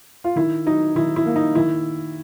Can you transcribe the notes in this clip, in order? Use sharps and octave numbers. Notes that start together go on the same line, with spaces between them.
F4
D#3 E4
F#3 D#4
D#3 E4
E4
A#3
D#4
D#3 E4